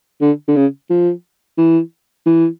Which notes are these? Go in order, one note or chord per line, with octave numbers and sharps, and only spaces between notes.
D3
D3
C#3
F3
E3
E3